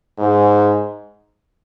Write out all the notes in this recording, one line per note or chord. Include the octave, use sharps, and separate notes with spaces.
G#2